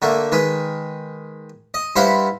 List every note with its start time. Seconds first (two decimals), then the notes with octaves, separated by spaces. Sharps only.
0.02 D3 A3 A#3
0.32 D#3 G#3 B4
1.74 D#5
1.96 G2 E4 C5 F5 F#5 B5